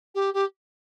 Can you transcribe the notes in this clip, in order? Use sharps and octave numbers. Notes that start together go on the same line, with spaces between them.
G4
G4